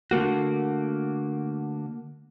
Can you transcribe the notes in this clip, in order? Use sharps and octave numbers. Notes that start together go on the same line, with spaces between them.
D3 A3 A#3 F#4